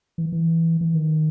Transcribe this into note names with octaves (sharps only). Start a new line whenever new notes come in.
E3
E3
E3
D#3